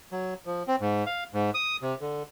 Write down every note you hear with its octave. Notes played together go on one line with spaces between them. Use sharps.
F#3
F3
C4
G#2
F5
G#2
D#6
C3
D3